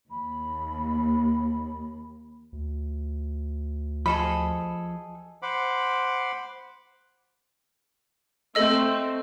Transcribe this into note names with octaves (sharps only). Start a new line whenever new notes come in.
D#2 B5
D2
F3 G#4 A4 D#5 B5
C5 F#5 B5 D6
A3 C4 A4 D#5 E6